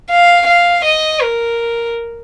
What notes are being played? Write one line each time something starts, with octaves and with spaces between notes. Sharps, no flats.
F5
F5
D#5
A#4